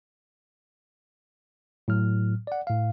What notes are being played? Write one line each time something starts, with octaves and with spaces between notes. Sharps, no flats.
A2 F#3 F6
D5 F#5
A2 F5